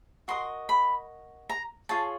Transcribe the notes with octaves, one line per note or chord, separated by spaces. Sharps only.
F#4 A#4 D#5 C6
B5
A#5
F4 G#4 C#5 A5